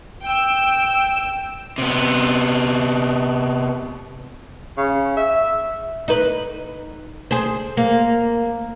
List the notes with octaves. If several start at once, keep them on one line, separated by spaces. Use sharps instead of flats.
G5 E6
C3 B3
C#3
E5
D#4 B4
G#4 C5
A#3